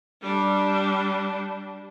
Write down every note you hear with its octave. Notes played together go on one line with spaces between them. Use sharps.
G3 D4